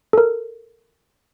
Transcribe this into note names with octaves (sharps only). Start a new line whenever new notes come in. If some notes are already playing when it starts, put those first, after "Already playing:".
A4 A#4